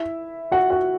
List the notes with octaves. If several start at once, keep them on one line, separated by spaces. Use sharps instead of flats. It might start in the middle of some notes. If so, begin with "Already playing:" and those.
Already playing: E4 E5
F#4 F#5
F#4 F#5